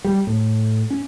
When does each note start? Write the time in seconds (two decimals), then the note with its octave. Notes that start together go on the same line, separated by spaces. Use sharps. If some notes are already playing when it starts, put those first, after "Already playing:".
0.05 G3
0.27 A2
0.90 C#4